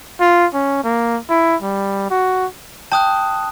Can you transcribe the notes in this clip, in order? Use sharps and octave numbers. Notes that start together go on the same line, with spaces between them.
F4
C#4
A#3
E4
G3
F#4
G5 A5 D#6 F#6